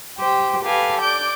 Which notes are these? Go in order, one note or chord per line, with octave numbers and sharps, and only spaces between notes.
G4 C5 G5
G4 A4 B4 F5 G#5
D5 D6 G6